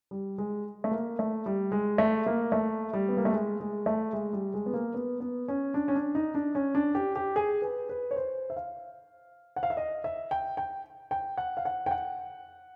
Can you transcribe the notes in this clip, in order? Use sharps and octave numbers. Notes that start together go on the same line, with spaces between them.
G3
G#3
A3
A#3
A3
G3
G#3
A3
A#3
A3
G3
B3
A#3
A3
G#3
G#3
A3
G#3
G3
G#3
B3
A#3
B3
B3
C#4
D4
C#4
D4
D#4
D4
C#4
D4
G4
G4
G#4
B4
B4
C#5
C5
E5
F5
F#5
F5
E5
D#5
E5
G5
G5
G5
F#5
F5
F#5
G5
F#5